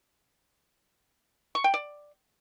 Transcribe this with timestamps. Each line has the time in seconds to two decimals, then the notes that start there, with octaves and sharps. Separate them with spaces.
1.55 C#6
1.64 G5
1.74 D5